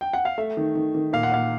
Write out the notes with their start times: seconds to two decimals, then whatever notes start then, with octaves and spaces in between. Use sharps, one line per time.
0.01 G5
0.13 F#5
0.25 F5
0.38 A3 E5
0.57 D#3
0.75 D#3
0.95 D#3
1.13 A#2 F5
1.23 F#5
1.32 A#2 F5